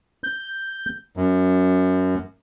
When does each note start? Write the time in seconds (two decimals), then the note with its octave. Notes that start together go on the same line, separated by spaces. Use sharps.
0.24 G6
1.17 F#2